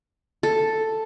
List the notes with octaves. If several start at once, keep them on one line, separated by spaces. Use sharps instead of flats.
A4